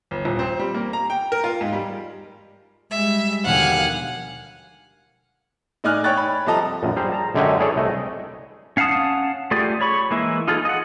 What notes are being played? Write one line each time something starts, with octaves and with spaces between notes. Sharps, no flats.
G1
D#1
C4
G3
A#3
A#5
G5
A#4
F4
G#2
G3
G3 G#3 E5
D#2 B2 D3 F3 F5 F#5 G#5
A2 D#4 D5 G#5 F6 F#6
C#5 G5 C#6 F#6 A6
B5
C2 F3 A4 D#5 A5 A#5
A#1 F#2
G3 G#4 C5 A#5
A5 A#5
F#2 D3 G#3 G4 C#5 G#5
E4 G#4 A4 C#5 D5
C2 A3 D#5
C#4 F5 F#5 A5 D#6
A3 F4 G4 G#4 D5
C#5 B5 C#6
E3 G#3 A#3 E4
D#4 F4 G#4 A4
D#5 F#5